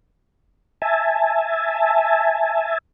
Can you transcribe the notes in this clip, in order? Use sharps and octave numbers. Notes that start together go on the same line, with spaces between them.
E5 G#5 A5